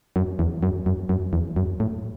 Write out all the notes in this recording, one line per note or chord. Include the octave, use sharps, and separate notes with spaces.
F#2
E2
F#2
F#2
F#2
E2
F#2
A2